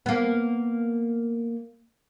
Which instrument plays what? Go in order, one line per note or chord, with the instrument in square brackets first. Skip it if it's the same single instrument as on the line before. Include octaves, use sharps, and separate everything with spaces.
[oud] A#3 B3